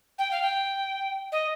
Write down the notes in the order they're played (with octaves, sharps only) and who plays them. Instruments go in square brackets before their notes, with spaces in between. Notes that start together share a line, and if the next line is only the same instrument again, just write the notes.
[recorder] G5
F5
G5
D#5